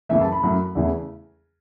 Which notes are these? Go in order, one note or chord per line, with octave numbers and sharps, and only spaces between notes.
F#2 C#3 E3 A3 E5
A5
B5
F#2 F#3 A3
E2 C#3 E3 A3